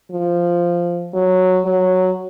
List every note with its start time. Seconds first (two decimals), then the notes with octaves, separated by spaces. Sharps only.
0.12 F3
1.14 F#3
1.65 F#3